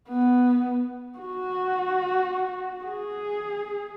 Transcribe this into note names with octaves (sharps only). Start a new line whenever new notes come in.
B3
F#4
G#4